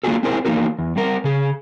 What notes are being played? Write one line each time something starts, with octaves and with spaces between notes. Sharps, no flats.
A#3 D4 F4 F#4 G#4 A4
C4 E4 G#4 A#4 C5
E3 A#3 C4 D#4 F#4 A#4
E2
G3 C4 A#4
C#3 G#4